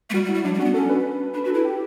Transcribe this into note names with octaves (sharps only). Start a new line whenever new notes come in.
A3
G3 F#4
G3
E4
G3
F#3 D4
G3
C#4 F#4
B3
C#4 A4
B4
D4 B4
F#4 B4
E4 A4
G4